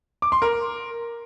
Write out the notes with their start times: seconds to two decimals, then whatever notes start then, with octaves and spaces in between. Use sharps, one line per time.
0.22 D6
0.32 C6
0.42 A#4